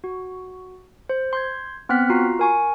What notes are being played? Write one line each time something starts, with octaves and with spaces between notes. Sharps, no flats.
F#4
C5
C6 G6 G#6
B3 C4 F#5 F6 F#6 B6
F4 F#4 A#5 C7
A#4 G#5 C#6